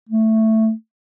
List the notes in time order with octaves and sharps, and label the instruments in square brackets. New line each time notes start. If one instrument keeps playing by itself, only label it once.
[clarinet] A3